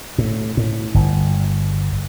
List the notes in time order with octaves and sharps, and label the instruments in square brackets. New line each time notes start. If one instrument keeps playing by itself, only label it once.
[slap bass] A2
A2
G1